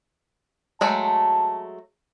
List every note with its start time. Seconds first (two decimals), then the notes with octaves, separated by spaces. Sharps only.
0.81 F#3 G#3 A3 A5